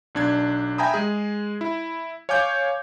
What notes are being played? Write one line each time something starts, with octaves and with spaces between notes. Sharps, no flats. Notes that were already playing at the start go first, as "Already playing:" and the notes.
B1 D4 G#6
E5 G5 G#5 A#5 B5 D#6
G#3 G#4
E4
C#5 F5 G#5 D6 G6